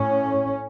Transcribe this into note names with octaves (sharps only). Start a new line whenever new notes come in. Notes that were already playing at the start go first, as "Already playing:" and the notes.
Already playing: A2 C#4